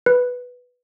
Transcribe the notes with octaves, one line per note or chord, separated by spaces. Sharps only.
B4